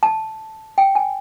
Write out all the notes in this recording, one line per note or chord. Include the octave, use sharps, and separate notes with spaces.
A5
G5
G#5